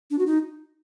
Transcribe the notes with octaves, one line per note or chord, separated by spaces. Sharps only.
D4
F#4
D#4